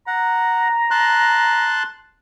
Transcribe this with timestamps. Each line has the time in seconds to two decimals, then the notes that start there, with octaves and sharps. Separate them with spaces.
0.07 F#5 A#5
0.91 A5 C6 F#6